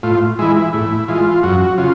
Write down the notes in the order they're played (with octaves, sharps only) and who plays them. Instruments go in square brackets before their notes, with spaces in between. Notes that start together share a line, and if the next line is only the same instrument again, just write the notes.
[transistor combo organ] A2 F4
E3 G#3 E4
E4
A2 E4
E3 G#3 F4
F#2 F#4
C#3 F4